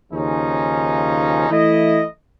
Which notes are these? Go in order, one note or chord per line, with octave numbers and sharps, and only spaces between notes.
D#2 C#3 F3 C#4 D#4
E3 A3 E4 D#5